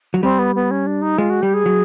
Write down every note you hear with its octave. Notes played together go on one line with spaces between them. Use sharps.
F#3
G3 C4
B3
B3
C#4
D4
D#4
G#3 F4
F#4
G3 G4
G#4
F#3